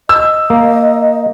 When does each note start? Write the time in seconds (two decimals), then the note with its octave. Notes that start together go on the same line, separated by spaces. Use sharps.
0.09 D#5 E6
0.50 A#3